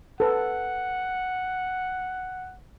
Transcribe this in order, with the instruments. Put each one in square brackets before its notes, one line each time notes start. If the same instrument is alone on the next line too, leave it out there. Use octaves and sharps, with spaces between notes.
[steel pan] A4 B4 [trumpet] F#5